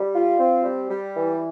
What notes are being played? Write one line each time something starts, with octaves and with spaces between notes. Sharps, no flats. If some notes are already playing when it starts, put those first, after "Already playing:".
Already playing: G3
F4
C4
G3
G3
E3